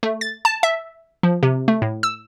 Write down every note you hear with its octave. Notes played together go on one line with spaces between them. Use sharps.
A3
A6
A5
E5
F3
C3
A3
A2
E6